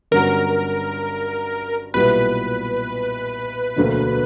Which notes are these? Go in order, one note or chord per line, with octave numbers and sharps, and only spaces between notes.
G1 G2 F#3 C#4 F#4 A#4
B1 A#2 G3 B3 E4 B4
E1 D2 D3 F#3 A#3